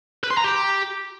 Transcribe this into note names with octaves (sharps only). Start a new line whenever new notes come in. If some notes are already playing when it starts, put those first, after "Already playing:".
B4
C6
A#5
G4